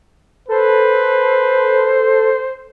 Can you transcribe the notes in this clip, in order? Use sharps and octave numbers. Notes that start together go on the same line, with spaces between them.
A4 B4 C5